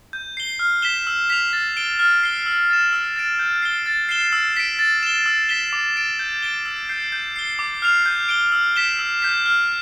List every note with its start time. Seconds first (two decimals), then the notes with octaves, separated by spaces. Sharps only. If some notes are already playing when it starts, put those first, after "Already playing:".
0.13 G6
0.37 C7 G7
0.59 F6
0.82 B6 E7 G7
1.07 E6
1.30 B6 F7
1.53 A6
1.77 D7 G7
1.99 F6
2.23 C7 G7
2.46 E6
2.70 A6 E7
2.93 E6
3.16 A6 D7
3.39 G6
3.62 C7 G7
3.86 A6
4.09 C7 E7 G7
4.33 E6
4.57 B6 D7
4.79 A6
5.03 E7 G7
5.26 E6
5.49 B6 E7 G7
5.73 D6
5.96 A6 D7
6.19 G6
6.42 D7 G7
6.66 E6
6.89 G6 C7
7.12 G6
7.36 C7 G7
7.59 D6
7.82 F6 C7 F7
8.06 G6
8.29 D7 G7
8.52 E6
8.76 B6 E7 G7
8.99 E6
9.22 G6 B6
9.45 F6